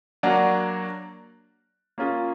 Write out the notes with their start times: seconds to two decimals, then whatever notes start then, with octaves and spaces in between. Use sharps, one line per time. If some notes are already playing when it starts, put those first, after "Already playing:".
0.23 F#3 A#3 D4 F#4
1.98 A#3 C#4 F4 G#4